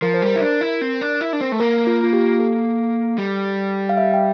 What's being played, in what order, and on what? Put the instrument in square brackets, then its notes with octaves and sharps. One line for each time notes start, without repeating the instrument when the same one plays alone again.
[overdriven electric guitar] F3 [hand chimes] A#4
[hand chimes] C5
[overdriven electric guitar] G3 [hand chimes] A#4
[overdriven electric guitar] E4
D4
E4
C4
D4
E4
D4
C4
A3
[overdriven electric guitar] A#3 [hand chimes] A#4
[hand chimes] F4
F4
G4
A4
[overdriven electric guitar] G3
[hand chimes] F5
E5
G5